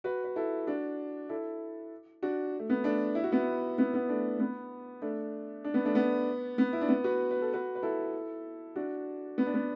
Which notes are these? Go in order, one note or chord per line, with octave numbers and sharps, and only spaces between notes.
F#4 B4
B4
E4 A4
D4 F#4
E4 A4
D4 F#4
A3
B3
A3 D4
E4
F#4
B3 E4
B3 E4
B3
A3 D4
B3
A3 D4
D4
B3
A3 D4
B3
B3
E4
D4
B3
F#4 B4
B4
A4
F#4 B4
B4
E4 A4
D4 F#4
B3
D4
B3